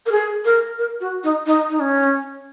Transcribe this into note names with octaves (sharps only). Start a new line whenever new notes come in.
A#4
G#4
A#4
A#4
F#4
D#4
D#4
D#4
C#4